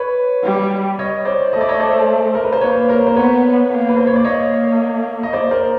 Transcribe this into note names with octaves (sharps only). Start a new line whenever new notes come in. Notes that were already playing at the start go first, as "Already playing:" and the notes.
Already playing: B4 C#5
G3
C#5 D#5
C5 D5
A3 D#5
D5
C#5 D#5
C5 D5
A#4
B4
C5
A#3 B4 C#5
A#4 C5
C5
B3 B4 C#5
A#3
B4
C5
C#5
D5
A#3 C#5 D#5
D#5
C5 D5
A#4 C5